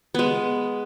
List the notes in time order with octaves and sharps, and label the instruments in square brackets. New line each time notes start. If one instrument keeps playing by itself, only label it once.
[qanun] G#3 B3